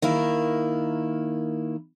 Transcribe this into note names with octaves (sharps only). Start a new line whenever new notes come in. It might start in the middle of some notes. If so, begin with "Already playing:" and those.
D#3 A#3 E4